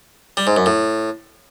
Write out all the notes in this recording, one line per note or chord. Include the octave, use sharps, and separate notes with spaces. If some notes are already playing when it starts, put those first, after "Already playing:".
G3
G#2
F#2
A2